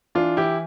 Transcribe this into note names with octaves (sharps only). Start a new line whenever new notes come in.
E3 D4 F4
E3 E4 G4